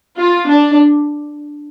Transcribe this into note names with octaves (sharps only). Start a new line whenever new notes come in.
F4
D4